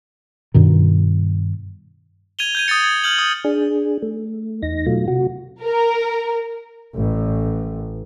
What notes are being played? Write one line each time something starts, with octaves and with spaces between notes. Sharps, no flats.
G2 B2 D#3
G#6 D#7 F7 G7
G6 G#6 D#7
D#6 G#6 A6 C#7 D#7
G#6
F6 G6 F#7
D#6
D4 G#4
A3
E2 D#4 A#6
B2 F#3 A3 F4
C3 F#4
A#4
A1